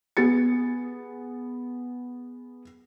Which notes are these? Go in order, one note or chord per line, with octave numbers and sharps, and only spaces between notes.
B3 G#4 A6 C#7